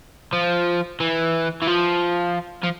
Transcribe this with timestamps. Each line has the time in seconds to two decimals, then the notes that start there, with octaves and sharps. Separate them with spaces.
0.33 F3
1.00 E3
1.62 E3
1.67 F3
2.63 F3